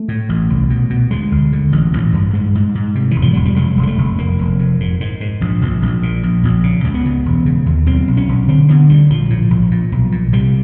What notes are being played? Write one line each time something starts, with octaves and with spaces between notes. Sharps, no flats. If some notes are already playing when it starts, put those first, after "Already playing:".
Already playing: A3
A2
A1
C2
B2
B2
D2 G#3
D2
D3
A1
A1
G2
G#2 G#3
G#2
G#2
C3
E1 E3
F3
E1 F#3
G3
F1 G#3
F1
G#3
A3
F1
F1 A#3
F1
F2
G#2
G#2
G#2
A#1
A#1
A#1
A#2
A#1
A#1
C#3
C#2
B3
C#3
E1
C#3
D#2
B1 C4
B1
C#4
B1
D3 C4
D3 B3
D2 G3
A#1 F3
A2
A#1
A#2
B1
A#2
C3 G3